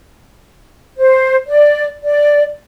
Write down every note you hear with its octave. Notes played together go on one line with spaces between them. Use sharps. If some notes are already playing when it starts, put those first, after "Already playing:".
C5
D5
D5